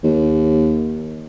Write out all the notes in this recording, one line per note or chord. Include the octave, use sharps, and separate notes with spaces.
D#2